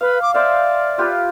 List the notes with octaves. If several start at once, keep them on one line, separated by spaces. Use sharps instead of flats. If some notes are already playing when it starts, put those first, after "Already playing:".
B4 F5
D6
C5 D5 E5 F5
F4 G4 B4